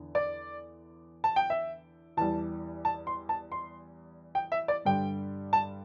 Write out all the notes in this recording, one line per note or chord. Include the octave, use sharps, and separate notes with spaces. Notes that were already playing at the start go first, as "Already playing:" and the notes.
Already playing: E2 D3
D5
A5
G5
E5
E2 E3 G3 A5
A5
C6
A5
C6
G5
E5
D5
G2 D3 G3 G5
A5